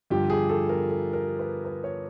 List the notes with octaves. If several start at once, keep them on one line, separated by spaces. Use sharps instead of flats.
G2 D3 F3 G4
G#4
A4
A#4
A4
A#4
B4
B4
C#5